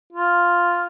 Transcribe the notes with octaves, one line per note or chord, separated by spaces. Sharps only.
F4